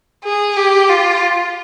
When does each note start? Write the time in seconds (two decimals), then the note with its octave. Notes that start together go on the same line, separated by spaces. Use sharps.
0.24 G#4
0.56 G4
0.89 F4